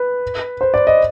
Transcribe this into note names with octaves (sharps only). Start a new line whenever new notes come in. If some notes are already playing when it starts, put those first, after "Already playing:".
Already playing: B4
C5
D5
D#5